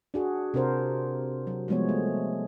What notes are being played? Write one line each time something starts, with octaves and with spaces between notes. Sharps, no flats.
D4 F#4 G#4
C3 D4 A#4 C5
F#3
F3 G3 G#3 B3 C#5
A3